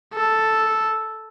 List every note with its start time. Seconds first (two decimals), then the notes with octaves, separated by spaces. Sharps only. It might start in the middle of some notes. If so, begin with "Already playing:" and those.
0.14 A4